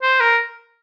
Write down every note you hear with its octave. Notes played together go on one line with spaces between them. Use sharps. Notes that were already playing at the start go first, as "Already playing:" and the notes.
C5
A#4